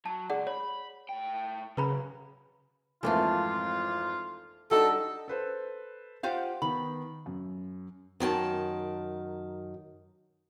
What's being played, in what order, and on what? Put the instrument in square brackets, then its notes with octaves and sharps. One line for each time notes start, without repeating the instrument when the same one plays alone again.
[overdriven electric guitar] F#3 [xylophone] A5
[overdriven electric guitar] C#2 C#3 [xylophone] G#4 D5 F#5
[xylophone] C#5 [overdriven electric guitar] B5
[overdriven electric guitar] A2 G5
[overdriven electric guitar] F#2 [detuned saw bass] C#3 [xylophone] B4 A#5 B5
[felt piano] G#1 F2 E3 [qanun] A3 A#3 A4 [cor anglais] F4
[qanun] G3 [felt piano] D4 D#4 F#4 [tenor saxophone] A4
[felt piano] A4 B4 C5
[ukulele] F4 G4 F5 [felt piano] C5 F#5
[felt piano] D#3 B3 [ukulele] B5
[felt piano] F#2
[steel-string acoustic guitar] F#2 D#3 G#5 A5